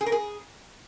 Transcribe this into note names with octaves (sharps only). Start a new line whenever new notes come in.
G#4
A#4
G#4